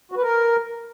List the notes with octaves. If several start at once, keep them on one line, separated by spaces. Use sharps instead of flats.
F#4
B4
A#4